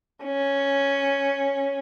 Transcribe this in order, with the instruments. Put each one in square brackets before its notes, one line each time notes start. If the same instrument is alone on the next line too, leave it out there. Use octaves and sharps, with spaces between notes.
[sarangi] C#4